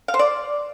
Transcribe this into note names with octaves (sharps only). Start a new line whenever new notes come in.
F5
C5
D5